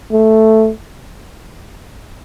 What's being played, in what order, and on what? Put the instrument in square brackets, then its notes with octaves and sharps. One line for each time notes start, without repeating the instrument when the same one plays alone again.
[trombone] A3